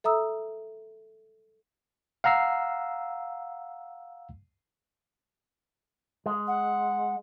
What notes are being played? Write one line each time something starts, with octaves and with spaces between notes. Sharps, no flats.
A4 E5 A#5 D#6 E6
F5 F#5 A#5 E6 C7
G#3
F#5